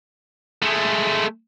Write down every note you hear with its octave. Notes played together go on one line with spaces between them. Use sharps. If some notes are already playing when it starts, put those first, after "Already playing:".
G#3 A3